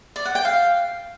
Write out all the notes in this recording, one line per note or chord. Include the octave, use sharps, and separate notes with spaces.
D5
F#5
G5
F5